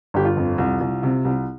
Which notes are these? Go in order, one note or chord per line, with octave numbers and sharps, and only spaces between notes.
G1 G4
F4
F2
C2
C2
C3
C2